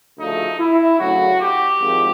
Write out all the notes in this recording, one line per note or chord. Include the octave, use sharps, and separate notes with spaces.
D2 C#3 F3 A3 D#4
E4
D2 C#3 F#3 F#4
G4
G#1 G#2 F3